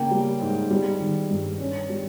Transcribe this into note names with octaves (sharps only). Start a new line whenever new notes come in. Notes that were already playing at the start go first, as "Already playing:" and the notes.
Already playing: C#3 A#3 G5
G3
G#2
G3
D#3
G2
C#4
G3